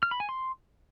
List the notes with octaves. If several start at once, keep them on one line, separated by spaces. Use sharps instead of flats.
F6
B5
G#5
C6